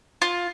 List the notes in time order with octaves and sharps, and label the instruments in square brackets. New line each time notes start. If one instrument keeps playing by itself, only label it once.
[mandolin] F4